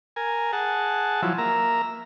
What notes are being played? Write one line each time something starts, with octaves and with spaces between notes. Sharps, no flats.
A#4 G#5
G#4 F#5 A5
F3 F#3 E4
A#3 E5 A#5